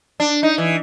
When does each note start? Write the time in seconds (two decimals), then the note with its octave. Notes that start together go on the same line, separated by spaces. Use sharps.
0.20 D4
0.43 D#4
0.58 E3